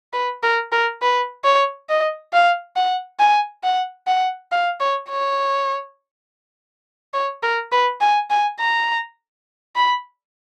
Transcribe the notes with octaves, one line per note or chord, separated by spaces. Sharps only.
B4
A#4
A#4
B4
C#5
D#5
F5
F#5
G#5
F#5
F#5
F5
C#5
C#5
C#5
A#4
B4
G#5
G#5
A#5
B5